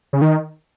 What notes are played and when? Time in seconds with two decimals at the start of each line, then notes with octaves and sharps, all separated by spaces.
0.13 C#3
0.22 D#3